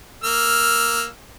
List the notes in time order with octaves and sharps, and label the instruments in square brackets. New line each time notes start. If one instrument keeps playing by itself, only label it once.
[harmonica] A#3 E6 F6